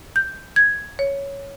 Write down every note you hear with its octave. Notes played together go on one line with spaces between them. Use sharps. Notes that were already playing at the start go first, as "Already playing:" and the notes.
G6
G#6
C#5